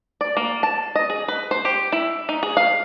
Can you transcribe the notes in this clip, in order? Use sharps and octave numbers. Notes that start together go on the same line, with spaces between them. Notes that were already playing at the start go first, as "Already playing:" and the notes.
D5
A#3
A5
D#5
G#4
B4
C5
G4
E4
D#4
G#4
F5